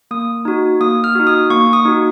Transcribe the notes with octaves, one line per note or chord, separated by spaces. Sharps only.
A#3 D#6
D#4 F#4
A#3 D#6
F6
D#4 F#4
D#6
A#3 C#6
D#6
D#4 F#4